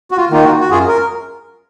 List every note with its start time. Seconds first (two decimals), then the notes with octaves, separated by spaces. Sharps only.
0.11 F#4
0.17 F4
0.30 D#3 A#3 D#4 F4
0.44 F#4
0.60 F#4
0.71 F#2 F4 G#4
0.88 A#4